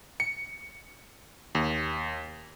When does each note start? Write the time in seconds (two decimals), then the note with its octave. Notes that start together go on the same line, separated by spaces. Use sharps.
0.20 C#7
1.55 D#2